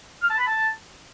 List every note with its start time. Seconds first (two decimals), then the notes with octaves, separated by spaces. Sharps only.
0.22 F6
0.30 A5
0.38 B5
0.47 A5